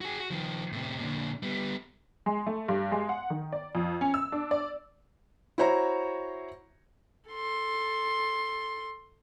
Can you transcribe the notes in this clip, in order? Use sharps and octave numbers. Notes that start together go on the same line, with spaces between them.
F#4 G#4
F#4
D#3 F3
A2 C3
A#2 D3
G3 B3
G#3
A3
G2
G#3
F#5
D#3
D5
F2
C#4
E6
D4
D5
E4 F#4 C5 C#5 A#5
A4 C6